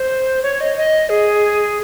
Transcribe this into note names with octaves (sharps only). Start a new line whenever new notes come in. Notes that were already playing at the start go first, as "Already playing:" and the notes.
Already playing: C5
C#5
D#5
D#5
G#4